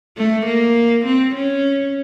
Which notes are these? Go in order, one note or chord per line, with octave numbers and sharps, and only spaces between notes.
A3
A#3
C4
C#4